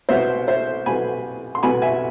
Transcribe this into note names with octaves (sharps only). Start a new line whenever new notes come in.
C2 B2 B3 C5 E5
C5 E5
C2 B2 B3 G#5 B5
C6
C2 B2 B3 G#5 B5
E5 G#5